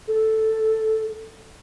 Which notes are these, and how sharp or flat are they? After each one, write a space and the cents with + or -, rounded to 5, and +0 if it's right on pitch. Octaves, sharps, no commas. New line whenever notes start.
A4 +0